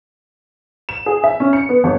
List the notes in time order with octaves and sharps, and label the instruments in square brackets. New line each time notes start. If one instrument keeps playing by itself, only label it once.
[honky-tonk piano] E7
G#4
E5
C#4
C#7
B3
G1